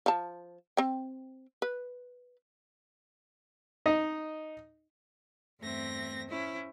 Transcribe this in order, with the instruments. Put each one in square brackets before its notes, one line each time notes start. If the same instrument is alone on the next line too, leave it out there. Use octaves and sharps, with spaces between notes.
[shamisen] F3 A5
C4 G5
B4
[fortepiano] D#4 D#5
[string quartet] E2 G2 A3 C4 E5 A#6
C#4 E4 C5